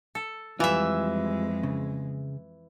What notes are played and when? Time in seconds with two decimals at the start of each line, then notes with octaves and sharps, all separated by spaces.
0.15 A4
0.60 F2 E3 G3 G#3 F4 E5
1.63 C#3